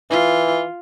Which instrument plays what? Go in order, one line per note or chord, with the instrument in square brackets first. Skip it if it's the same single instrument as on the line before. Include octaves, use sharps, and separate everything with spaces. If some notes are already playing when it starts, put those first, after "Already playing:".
[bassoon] E3 [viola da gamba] F4